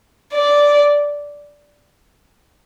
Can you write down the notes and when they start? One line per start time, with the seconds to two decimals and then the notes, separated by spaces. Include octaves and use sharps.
0.34 D5